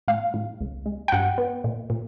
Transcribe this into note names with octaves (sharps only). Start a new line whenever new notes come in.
A2 F5
A2
C#2
G#3
G5
G2 F#5
B3
A#2
A#2